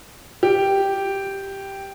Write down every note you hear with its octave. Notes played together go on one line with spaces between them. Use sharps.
G4